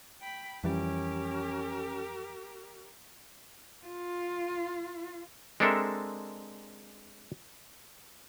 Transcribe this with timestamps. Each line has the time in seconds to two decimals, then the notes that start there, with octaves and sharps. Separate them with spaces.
0.21 G5 B5
0.64 F2 E3 G3 C#4 G4 A#4
3.86 F4
5.60 G#3 C4 D4 A4 A#4 E5